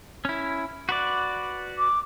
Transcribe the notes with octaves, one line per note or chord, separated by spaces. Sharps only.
C#4 E4
F#4 B4 D5
D6